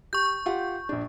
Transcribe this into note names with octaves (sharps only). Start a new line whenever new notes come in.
G4 C#6 G6
F4 G4 F#5
A#1 D4